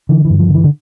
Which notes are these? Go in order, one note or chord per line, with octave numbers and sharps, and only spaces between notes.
D3 E3
E3
G2
F3
D3
E3
D3